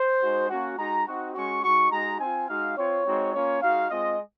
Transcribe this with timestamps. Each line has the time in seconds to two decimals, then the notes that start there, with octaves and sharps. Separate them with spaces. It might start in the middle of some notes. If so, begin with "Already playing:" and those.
Already playing: C5
0.21 G#3 D#4 F#4
0.49 A#3 C#4 F#4
0.77 G#3 D#4 F#4 A#5
1.06 C4 D#4 F#4
1.34 G#3 C#4 F#4 C#6
1.63 G#3 D#4 F#4 C#6
1.91 G#3 D#4 F#4 A#5
2.19 C4 F4 G#5
2.48 G#3 D#4 F#4 F5
2.76 C4 F4 C#5
3.05 G#3 C4 D#4 F#4
3.33 A#3 C#4 F4 C#5
3.61 G#3 D#4 F#4 F5
3.90 G#3 C4 F4 D#5